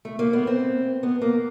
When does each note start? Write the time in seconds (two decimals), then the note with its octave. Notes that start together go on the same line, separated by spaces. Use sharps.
0.05 A3
0.19 A#3
0.33 B3
0.47 C4
1.03 B3
1.21 A#3